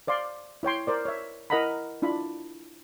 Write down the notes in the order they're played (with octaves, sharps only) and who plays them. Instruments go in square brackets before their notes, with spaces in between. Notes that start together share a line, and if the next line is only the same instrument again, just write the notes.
[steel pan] C5 D5 F5 C6
E4 C#5 G5 C6
A#4 C5 D5
C#5 E5
E4 A#4 D#5 F#5 A#5 B5
D4 E4 F4 B5